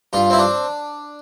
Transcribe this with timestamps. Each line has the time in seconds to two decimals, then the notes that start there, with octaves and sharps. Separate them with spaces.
0.13 G2 F4
0.30 C4 E4
0.39 D4